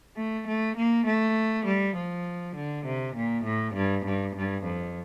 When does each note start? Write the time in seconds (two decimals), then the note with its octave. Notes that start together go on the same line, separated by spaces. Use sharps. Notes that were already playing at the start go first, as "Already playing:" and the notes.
0.16 A3
0.47 A3
0.77 A#3
1.06 A3
1.66 G3
1.96 F3
2.56 D3
2.85 C3
3.16 A#2
3.45 A2
3.74 G2
4.05 G2
4.35 G2
4.64 F2